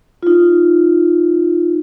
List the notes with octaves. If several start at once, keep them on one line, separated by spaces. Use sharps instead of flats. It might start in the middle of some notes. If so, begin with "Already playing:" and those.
D#4 F4